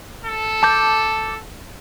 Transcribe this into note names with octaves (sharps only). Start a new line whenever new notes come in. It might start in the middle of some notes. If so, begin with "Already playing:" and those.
A4
A5 D6 G6